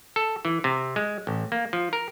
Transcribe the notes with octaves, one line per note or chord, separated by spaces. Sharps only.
A4
E3
C3
G#3
A1
A#3
F3
A#4